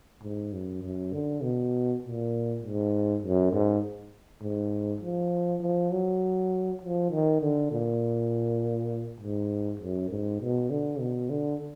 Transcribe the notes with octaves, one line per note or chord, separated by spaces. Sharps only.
G#2
F#2
F#2
D3
B2
A#2
G#2
F#2
G#2
G#2
F3
F3
F#3
F3
D#3
D3
A#2
G#2
F#2
G#2
B2
D3
B2
D3